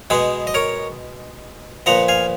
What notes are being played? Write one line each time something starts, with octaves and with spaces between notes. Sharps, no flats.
B2 G#3 B3 G#4 B4
D#5
A#4 C#5
A#2 F3 B3 F#5 A#5
F5 G#5